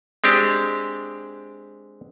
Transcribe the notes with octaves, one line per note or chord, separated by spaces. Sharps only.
G#3 C4 D4 G4